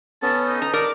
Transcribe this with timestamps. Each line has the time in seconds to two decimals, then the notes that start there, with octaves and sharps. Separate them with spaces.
0.22 B3 C#4 A4 A5
0.47 D#4
0.62 A#5
0.74 A#4 D5 A5 D6